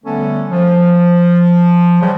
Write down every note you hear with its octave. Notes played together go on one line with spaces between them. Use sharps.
D3 G3 A3 B3 C#4 A4
F3
C#3 E3 F#3 G3